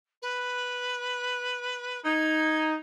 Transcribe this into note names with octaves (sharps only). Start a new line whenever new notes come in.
B4
D#4 G#6